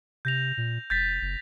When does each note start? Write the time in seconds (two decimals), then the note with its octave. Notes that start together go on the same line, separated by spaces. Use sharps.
0.25 C3 G6 A#6 F7
0.57 A#2
0.90 F1 G6 A6 B6
1.21 F#1